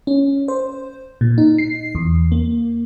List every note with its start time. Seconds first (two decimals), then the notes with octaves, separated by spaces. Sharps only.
0.07 C#4
0.48 C5
1.21 A#2
1.38 D#4
1.58 C7
1.95 E2
2.32 A#3